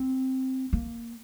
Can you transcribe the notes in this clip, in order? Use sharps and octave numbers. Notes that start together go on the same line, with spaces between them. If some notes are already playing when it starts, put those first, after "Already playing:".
Already playing: C4
A#3